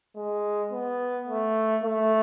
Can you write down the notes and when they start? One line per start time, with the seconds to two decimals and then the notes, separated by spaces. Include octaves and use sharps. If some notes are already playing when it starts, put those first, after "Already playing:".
0.16 G#3
0.72 B3
1.28 A3
1.84 A3